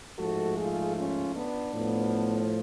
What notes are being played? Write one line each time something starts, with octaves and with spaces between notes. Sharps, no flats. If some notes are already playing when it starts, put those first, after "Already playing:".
G#2 F3 A3 F#4 A4
F4 G#4
C#4 F4
B3 D4
A2 F3 B3